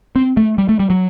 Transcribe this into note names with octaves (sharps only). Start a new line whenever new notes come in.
C4
A3
G3
A3
G3
F#3